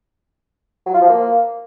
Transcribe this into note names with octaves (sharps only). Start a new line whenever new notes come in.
F#3
F4
F3
A#3